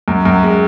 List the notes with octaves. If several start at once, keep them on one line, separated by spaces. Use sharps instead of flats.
F#2
F#2
G#3